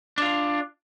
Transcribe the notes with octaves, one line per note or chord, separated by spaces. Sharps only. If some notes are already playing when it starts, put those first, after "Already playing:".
D4 F4